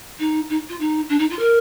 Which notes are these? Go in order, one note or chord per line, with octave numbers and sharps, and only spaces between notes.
D#4
D#4
F4
D#4
D4
D#4
F4
A#4